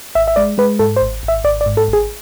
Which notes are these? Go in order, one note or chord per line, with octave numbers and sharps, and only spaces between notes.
G#1 E5
E5
G#3 D5
G#3 B4
G#2 A4
C5
G#1
G#1
E5
G#1 D5
D5
G#2
A4
G#1
G#4